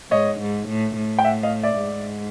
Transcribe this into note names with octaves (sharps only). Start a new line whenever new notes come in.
G#2 C#5 D#5
G#2
A2
A2
G5
E5 F#5
D#5 F5
D5 E5
G#2